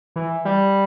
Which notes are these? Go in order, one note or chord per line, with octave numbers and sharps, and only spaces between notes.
E3
G3